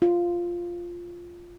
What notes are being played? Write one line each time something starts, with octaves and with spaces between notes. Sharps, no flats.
F4